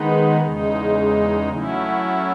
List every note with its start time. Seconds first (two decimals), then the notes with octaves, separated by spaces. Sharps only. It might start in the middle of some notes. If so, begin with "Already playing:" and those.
Already playing: D#3 G#3 B3 D#4
0.41 E2 C#3 G#3 D#4
1.49 F#3 A3 C#4 E4